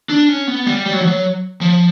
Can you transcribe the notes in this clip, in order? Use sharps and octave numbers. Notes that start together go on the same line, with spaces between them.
D4
C#4
B3
G3
G3
F#3
F3
F#3
F3